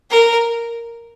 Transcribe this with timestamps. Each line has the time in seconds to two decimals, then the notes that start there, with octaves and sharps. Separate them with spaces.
0.10 A#4